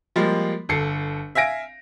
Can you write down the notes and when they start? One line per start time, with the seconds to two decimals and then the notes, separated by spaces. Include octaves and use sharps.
0.16 F3 G3 G#3 A#3
0.69 G1 A4 C7 C#7
1.35 E5 F5 G#5 A#6 D7